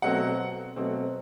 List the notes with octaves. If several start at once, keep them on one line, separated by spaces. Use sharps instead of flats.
B2 F#3 A3 C4 F#5
B2 F#3 A3 C4